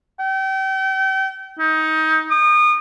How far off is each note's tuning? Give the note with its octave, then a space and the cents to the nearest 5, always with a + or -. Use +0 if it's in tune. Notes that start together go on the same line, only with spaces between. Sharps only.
G5 -35
D#4 +20
D#6 -35